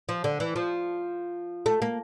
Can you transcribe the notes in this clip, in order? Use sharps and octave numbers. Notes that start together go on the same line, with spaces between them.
F3
D3
E3
F3
A3
A#3